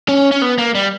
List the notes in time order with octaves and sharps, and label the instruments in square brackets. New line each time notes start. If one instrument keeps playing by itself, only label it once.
[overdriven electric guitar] C#4
C#4
B3
A#3
G3